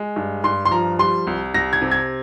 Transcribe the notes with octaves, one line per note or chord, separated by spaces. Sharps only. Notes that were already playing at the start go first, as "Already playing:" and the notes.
Already playing: G#3
G2
G2 C6
C6
F3 A#5
G3 C6
C2
C2 A#6
G#6
C3
G#6